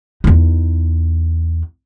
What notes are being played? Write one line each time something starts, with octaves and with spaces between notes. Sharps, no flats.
E2 D#4